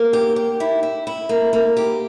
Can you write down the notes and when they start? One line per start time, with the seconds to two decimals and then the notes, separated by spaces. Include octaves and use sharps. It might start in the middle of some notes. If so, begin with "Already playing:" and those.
Already playing: A#3
0.13 G4
0.36 G4
0.60 E4
0.83 E4
1.07 E4
1.29 A#3
1.53 A#3
1.77 G4